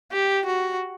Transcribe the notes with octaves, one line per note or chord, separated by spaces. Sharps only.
G4
F#4